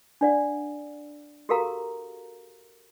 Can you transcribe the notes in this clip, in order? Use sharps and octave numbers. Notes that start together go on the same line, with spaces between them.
D4 D5 F#5
F#4 G4 A4 A#4 F5 A#5